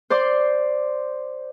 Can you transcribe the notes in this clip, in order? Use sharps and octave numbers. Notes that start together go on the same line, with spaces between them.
C5 D5 C6